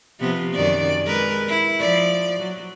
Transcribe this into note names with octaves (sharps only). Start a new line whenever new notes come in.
C3 F3 B3
F#2 D#3 D5
G#3 A#4 B4
E4
F3 D5
F#3